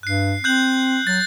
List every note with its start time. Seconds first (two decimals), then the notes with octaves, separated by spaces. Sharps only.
0.03 G2 F#6 C7
0.44 C4 F#6 G6 F#7
1.07 F#3 A6